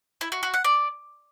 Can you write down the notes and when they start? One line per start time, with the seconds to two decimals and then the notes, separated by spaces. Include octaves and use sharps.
0.21 E4
0.32 F#4
0.43 F#4
0.54 F#5
0.64 D5